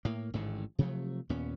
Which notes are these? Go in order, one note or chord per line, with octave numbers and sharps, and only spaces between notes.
A2 A#3
A1 G#2 D3 D#3
C3 F3 F#3 A3
D#2 A#2 B3 C#4